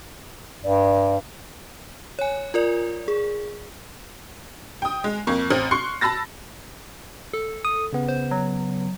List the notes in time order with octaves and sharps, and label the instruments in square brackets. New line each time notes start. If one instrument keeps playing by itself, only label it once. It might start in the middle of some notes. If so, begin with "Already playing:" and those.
[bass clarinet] G2 [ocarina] D5
[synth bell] C#5 G#5
F4 A#4 D5
G#4
[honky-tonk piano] G5 D#6
G#3
F2 A#3 C#6
A1 C4 F6 F#7
C6 C#6 F#6 C7 C#7
A5 B5 E6 A6 A#6
[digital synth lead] A4
[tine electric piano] D#6
C#3 B3
[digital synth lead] C5
F#3